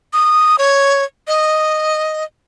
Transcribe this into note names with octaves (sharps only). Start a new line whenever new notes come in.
D#6
C#5
D#5